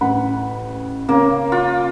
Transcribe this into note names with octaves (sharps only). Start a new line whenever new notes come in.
A1 F#5 B5
C#3 A#3 C#4
F4